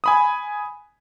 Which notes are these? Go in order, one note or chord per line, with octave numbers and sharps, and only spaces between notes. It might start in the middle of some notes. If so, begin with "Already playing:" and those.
G#5 B5 D#6